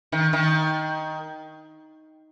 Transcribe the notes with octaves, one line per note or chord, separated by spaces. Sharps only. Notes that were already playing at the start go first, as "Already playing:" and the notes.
D#3
D#3